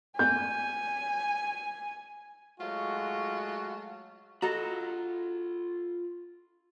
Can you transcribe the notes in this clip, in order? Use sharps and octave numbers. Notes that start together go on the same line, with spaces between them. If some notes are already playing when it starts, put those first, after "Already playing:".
G#5 G6
F#3 G#3 A3 F4 F#4
F4 F#4 A4 D#5 A#5 B5